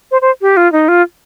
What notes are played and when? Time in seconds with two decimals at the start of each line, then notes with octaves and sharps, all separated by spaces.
0.11 C5
0.21 C5
0.41 G4
0.57 F4
0.72 D#4
0.88 F4